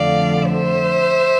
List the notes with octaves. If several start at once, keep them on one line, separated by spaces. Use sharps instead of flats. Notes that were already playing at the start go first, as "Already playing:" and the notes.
Already playing: F2 D3 F3 A3 D5 F5
C5 E5